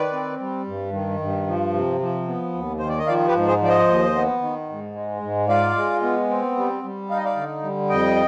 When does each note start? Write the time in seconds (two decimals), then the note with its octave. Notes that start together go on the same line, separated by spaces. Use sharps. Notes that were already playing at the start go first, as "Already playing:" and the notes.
Already playing: D#3 B4 D5
0.13 C4
0.40 G3
0.67 G2
0.93 D#3
1.20 G2
1.47 F3
1.73 C3
2.01 F3
2.27 B3
2.54 D#2
2.79 D#3 C5
2.89 D5
2.98 D#5
3.07 F3 D5 F5
3.28 G4 B4
3.34 G#2
3.47 G#4 C5
3.61 F3 D5
3.68 C5 D#5
3.88 D#2
4.15 B3
4.41 D#3
4.69 G#2
4.95 G#3
5.22 G#2
5.48 F4 D5 F5
5.76 G#3
6.02 B3
6.30 C4
6.56 G3
6.83 G3
7.10 D#4 F5
7.17 D#5
7.24 D5 F5
7.36 D3
7.63 G3
7.89 F2 D#5 G5